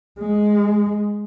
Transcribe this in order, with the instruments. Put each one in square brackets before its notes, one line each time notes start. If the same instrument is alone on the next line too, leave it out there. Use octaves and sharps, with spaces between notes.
[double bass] G#3